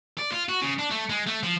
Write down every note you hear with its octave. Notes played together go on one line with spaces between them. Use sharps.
D5
F4
F#4
C#3
D4
A3
G#3
A3
F3